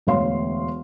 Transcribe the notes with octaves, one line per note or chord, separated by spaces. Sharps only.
E1 D2 C#5 F5 C6